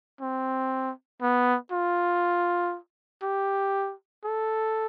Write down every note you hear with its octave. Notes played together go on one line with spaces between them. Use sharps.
C4
B3
F4
G4
A4